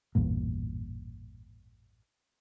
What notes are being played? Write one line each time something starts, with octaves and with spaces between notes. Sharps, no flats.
A1 E2 G2 A#2